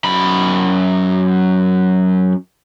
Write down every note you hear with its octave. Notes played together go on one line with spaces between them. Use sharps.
F#2 B5